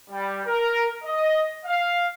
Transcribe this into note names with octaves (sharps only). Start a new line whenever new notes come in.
G3
A#4
D#5
F5